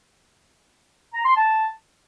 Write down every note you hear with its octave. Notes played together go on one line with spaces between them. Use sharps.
A#5
C6
A5